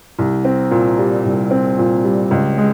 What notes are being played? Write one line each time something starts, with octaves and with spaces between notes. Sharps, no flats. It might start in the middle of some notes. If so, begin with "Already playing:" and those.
C2
C4
A#2
G3
C2
C4
A#2
G3
C#2
G#3